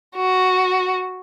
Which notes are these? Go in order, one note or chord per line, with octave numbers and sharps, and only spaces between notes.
F#4